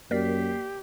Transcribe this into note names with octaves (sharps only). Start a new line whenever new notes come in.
F#2 A#3 G4 A#4 D5 B6 C7